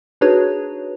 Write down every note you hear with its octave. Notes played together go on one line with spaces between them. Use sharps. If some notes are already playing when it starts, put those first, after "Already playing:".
D4 D#4 F#4 G#4 B4 C#5